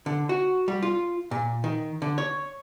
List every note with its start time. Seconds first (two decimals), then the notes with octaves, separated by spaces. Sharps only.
0.06 D3
0.29 F#4
0.68 G3
0.83 F4
1.31 A#2
1.64 D#3
2.02 D3
2.18 C#5